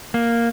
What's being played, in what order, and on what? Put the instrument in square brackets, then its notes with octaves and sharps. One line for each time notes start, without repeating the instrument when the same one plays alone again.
[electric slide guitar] A#3